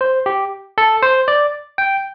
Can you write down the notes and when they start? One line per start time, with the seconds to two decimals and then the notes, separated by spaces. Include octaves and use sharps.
0.01 C5
0.26 G4
0.78 A4
1.02 C5
1.28 D5
1.78 G5